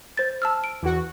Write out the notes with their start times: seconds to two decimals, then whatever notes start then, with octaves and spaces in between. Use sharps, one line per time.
0.17 C5 A6
0.42 A5 E6 F6
0.64 D7
0.82 E2 F#4